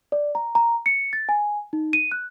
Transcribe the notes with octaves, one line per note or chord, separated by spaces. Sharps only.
D5
A#5
A#5
C#7
A6
G#5
D#4
D#7
F#6